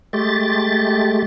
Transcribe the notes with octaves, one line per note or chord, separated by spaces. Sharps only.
G#3 A3 G4 A6